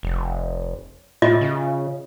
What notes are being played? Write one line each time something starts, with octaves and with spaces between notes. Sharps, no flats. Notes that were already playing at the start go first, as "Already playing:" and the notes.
F1
A2 F4 D#5 E5
C#3